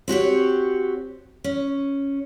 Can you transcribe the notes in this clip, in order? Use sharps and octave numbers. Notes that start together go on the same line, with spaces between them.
C4 F#4 G4 C#5
C#4